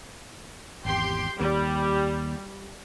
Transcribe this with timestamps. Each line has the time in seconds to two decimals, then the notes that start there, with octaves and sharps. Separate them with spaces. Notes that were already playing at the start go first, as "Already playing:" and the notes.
0.85 G#1 E2 G4 G5 C6
1.40 D#2 G3